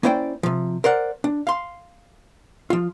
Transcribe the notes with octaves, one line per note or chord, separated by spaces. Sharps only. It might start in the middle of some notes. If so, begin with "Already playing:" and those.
A#3 C#4 E4 C5 D5 G5
C3 F3
A#4 C5 D5 F#5
D4
F5 C6
F3 F4